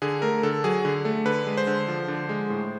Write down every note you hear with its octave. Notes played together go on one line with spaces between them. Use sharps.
D3 G#4
A3 A#4
D3 A4
F#3 G#4
D3
A3
D3 B4
G#3
C5
D3
F3
D3
G#3
A2